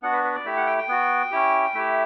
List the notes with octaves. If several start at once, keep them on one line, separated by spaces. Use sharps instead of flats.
B3 D4 F#4 F#5
B4
B4
D5
A3 E4 G4 E5
F#5
G5
G5
B3 F#4
C#4 E4 G4
A3 E4 G4 E5